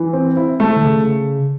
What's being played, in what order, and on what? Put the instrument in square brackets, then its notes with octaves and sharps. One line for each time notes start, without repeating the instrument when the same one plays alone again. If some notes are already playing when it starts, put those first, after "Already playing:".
Already playing: [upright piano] E3
C4
E4
A3
[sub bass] D3
C#3